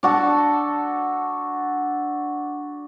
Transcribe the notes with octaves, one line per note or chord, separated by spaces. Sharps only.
D4 F#4 A4